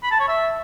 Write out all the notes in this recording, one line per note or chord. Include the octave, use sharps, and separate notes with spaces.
B5
A5
C#5
E5